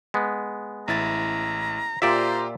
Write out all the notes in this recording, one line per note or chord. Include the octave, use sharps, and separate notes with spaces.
G#3 B3
A1 E4 A#5 A6
A#2 F4 G4 C5 D5 E5 A#5